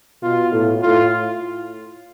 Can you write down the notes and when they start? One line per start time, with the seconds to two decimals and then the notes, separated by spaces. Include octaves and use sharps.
0.22 B2 F4
0.52 A2
0.82 A2 F4